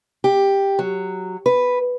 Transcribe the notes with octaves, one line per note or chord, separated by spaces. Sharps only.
G4
F#3
B4